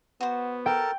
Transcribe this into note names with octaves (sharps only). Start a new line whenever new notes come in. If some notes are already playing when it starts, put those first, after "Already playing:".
B3 F#4 C5
A4 A#4 G5 A5